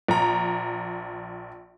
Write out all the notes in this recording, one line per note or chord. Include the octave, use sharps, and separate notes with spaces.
A#1 A#5